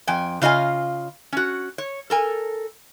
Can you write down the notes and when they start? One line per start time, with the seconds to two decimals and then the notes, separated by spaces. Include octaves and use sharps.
0.07 F2 G5 G#5
0.42 C#3 F4 D#5 F5 G#5
1.33 C#4 F#4
1.78 C#5
2.10 A4 A#4 G#5